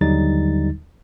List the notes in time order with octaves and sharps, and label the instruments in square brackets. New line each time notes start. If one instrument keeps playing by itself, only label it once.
[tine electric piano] D#2 D3 F#3 G3 D#4 A6